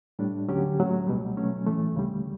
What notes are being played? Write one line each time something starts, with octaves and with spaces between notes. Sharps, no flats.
A2 G3 D4
D2 D3 F#3 C#4 G4
A2 F#3 A3
C#2 B2 G3
B2 F#3 A3 C#4
A2 E3 A3
D2 C#3 G3